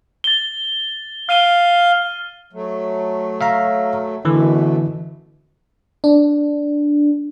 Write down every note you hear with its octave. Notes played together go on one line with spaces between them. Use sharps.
A6 G7
F5 F6 D#7 G7
F#3 A3
E5 F5 A#5
F#2 B2 D3 E3 A3
D4